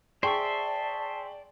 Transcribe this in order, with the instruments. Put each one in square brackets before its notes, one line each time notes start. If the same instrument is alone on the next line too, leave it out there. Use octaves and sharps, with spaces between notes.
[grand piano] G#4 G5 C#6 [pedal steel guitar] C5 E5 [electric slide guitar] D5 [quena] A5